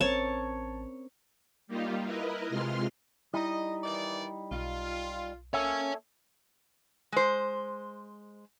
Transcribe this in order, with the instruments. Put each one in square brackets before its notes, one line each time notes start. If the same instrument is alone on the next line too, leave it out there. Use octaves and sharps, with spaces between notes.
[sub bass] A1 [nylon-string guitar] C4 C#4 A#4 [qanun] C#5 A5
[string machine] G3 A#3 D#4 F4 G4
E4 A#4 B4 D#5
C3 G#3 F4 C6 F6
[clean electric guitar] G3 D#4 [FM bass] E4 [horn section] D#5
[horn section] D#3 E3 D5
[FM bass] B1 [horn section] F4
[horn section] A#3 C#4 [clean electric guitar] A4 E5 [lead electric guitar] C#5 G#5
[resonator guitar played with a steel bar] G#3 C5